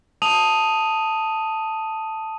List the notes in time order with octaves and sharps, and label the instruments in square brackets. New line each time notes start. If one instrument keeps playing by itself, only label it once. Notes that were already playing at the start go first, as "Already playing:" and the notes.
[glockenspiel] A5 D#6 D#7 F7 F#7